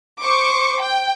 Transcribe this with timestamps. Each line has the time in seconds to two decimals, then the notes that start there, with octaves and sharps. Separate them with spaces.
0.21 C5 C#6 D6
0.81 G5